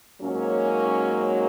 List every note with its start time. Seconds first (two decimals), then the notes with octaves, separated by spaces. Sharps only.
0.22 G#2 F#3 A#3 C#4